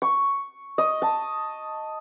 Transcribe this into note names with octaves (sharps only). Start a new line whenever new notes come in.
C#6
D#5
A5